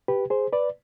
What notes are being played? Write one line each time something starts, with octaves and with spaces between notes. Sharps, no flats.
G4 B4
G#4 C5
B4 D5